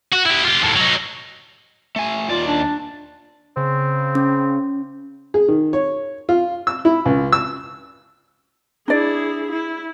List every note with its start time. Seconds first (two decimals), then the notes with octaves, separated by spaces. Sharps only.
0.12 F#4
0.25 E4 G4
0.44 F4 G4
0.61 D#2 A2
0.76 F#3 D#4
1.96 A3 G#5
2.29 D#2 F4 D5
2.47 D4
3.57 C#3 C4
4.15 C#4
5.34 G#4
5.48 D#3
5.73 C#5
6.29 F4
6.67 E6
6.85 E4
7.06 C#2
7.33 E6
8.88 D4 E4 G#4 D5
9.52 E4